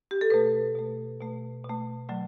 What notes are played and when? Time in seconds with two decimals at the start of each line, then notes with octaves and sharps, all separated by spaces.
0.11 G4
0.21 A4
0.30 B2 A3 B4
0.75 B2 A3
1.20 B2 A3
1.64 B2
1.70 A3
2.09 D3 F#3 A3